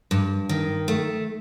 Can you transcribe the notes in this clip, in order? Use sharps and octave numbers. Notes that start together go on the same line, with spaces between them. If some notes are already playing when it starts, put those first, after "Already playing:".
G2
D#3
A3